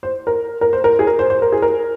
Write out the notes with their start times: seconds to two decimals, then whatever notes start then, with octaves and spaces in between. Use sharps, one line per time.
0.03 C5
0.27 A#4
0.61 A#4
0.73 C5
0.84 A#4
0.99 G#4
1.07 A#4
1.19 C5
1.30 C5
1.42 A#4
1.52 G#4
1.62 A#4